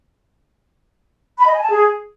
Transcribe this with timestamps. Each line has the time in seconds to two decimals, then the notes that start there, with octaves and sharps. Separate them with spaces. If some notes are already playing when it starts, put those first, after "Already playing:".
1.38 B5
1.46 D#5
1.54 G#5
1.62 A5
1.70 G#4